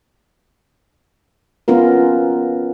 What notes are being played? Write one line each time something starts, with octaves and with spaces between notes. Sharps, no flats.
B3 C#4 F4 A#4